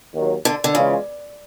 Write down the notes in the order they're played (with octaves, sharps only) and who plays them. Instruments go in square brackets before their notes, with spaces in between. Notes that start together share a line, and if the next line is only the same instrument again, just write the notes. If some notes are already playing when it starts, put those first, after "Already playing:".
[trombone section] D#2 D#3 F#3
[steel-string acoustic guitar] D3
D3
[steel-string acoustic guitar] C#3 [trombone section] E3 G#3 C#4 F4